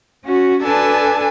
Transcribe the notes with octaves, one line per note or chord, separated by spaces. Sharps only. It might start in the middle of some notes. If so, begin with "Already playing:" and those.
C#4 F#4
D4 A4 B4 G#5 A5